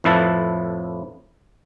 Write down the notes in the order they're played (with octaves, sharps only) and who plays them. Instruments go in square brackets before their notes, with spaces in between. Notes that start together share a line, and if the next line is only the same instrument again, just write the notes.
[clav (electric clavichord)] F2 A2 F3 E4 B4 A5